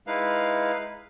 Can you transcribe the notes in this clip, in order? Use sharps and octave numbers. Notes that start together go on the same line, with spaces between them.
G#3 D#4 E4 B4 F5